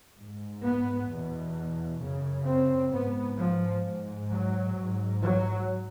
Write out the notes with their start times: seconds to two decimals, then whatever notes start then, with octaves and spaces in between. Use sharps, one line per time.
0.16 G#2
0.63 B3
1.09 E2 B2
2.01 F#2 C#3
2.47 C4
2.92 G#2 B3
3.37 F3
3.84 G#2
4.30 F#3
4.76 G#2
5.22 F#3